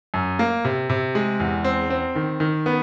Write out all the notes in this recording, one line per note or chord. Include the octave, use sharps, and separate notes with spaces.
F#2
A#3
C3
C3
G#3
E2
C4
C4
D#3
D#3
B3